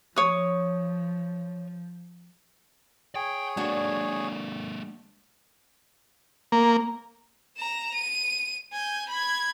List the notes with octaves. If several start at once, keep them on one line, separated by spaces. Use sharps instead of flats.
F3 C#5 D#6
G#4 C#5 G5
G#3 A#3 D4 F#4
A#3
A#5 E7
D#7
G#5 G6
B5 G#6